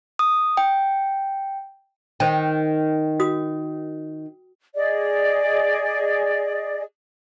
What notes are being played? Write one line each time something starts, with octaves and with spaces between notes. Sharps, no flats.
D#6
G5
D#3 C5 G5
F#4 D#6
G#4 D5 D#5